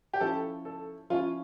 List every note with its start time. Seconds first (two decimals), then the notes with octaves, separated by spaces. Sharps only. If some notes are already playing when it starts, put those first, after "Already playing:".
0.14 G4
0.21 F3 C#4 E4 A4
0.65 A4
1.10 F3 C#4 E4 F4